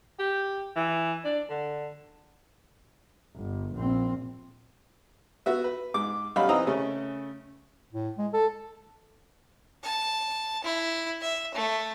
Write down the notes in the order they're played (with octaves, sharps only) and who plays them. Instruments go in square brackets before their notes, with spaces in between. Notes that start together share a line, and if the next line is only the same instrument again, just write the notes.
[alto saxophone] G4
E3
D4
D3
[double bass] G1
A#1 C4
[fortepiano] B3 F#4 E5
B4
G#2 D6
B1 G3 C#4 F5 B5
E3 C4 D#5 A#5 D#6 E6
C#3 A3 C#4
[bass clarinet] A2
G#3
A4
[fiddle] A5
E4
E5
A3